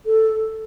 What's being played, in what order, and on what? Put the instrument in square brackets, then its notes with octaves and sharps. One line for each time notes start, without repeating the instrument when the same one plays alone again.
[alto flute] A4